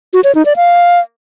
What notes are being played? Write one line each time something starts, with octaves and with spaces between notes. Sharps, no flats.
F#4
C#5
D#4
D5
F5